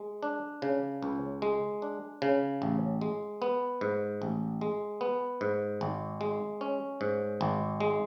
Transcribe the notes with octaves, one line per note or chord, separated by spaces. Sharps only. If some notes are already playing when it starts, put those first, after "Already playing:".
Already playing: G#3
D4
C#3
C#2
G#3
D4
C#3
A1
G#3
B3
G#2
A1
G#3
B3
G#2
G#1
G#3
C#4
G#2
G#1
G#3